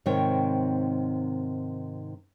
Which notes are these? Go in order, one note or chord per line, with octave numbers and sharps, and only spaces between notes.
G#2 C3 D#3 C4 C#5 G5